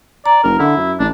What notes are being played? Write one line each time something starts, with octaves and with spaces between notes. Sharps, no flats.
D5 A#5
F#1 A#4
D3 E4
F#2
A1 D4